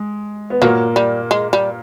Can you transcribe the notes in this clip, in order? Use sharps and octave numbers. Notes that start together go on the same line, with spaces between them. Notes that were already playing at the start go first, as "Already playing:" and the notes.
Already playing: G#3
B3
A#2 F#3 A#3
G3
G#3
G3